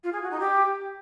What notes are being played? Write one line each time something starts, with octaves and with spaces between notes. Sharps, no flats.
F4
G#4
F#4
D#4
G4